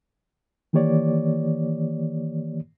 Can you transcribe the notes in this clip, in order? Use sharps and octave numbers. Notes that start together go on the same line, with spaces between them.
D#3 E3 A#3 G4 C#5 D5